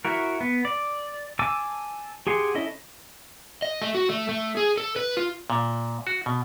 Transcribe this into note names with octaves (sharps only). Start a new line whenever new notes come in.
E4 F#4 A#4
B3
D5
G#5 A5 D6 E6
G4 G#4 F#5 C6
C#4 E4 A4 D#5
D#5
A3
F#4
A3
A3
G#4
A4
B4
F4
A#2
F#4
B2